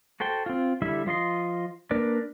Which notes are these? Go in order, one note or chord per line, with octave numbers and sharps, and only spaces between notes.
F#4 A4 C5 G5
C4 F4
D3 G3 E4 E5
F3 F4 D#5 C6
A#3 D4 A#4 B4 D5